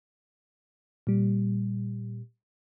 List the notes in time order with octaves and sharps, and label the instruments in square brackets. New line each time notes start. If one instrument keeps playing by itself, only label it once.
[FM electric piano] A#2 G3